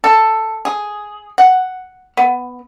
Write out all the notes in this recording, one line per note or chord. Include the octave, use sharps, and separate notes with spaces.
A4
G#4
F#5
B3